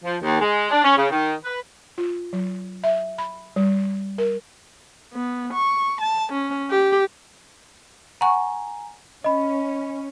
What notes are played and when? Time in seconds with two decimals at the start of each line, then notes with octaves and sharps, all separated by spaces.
0.04 F3
0.22 D#2
0.41 G#3
0.71 D4
0.84 C#4
0.97 C#3
1.11 D#3
1.44 B4
1.98 F4
2.33 F#3
2.84 E5
3.18 B5
3.56 G3
4.18 A#4
5.14 B3
5.53 C#6
6.01 A5
6.32 C#4
6.71 G4
8.21 F#5 G#5 A#5 C#6
9.24 C#4 D#5 B5